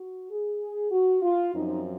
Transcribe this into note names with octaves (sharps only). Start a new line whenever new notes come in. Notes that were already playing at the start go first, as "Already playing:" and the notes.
Already playing: F#4
G#4
F#4
F4
F#2 F3 C4 D#4